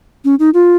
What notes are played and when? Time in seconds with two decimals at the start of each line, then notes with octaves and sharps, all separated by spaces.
0.24 C#4
0.39 D#4
0.54 F4